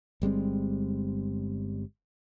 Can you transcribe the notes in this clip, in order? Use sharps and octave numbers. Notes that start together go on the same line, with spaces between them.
G1 G3 G#3 C4